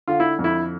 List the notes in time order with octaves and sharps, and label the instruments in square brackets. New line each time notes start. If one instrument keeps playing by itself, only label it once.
[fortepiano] D3 F4
E4
F2
E4